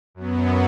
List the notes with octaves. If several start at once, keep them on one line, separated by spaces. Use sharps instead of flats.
F#2 F#3 B3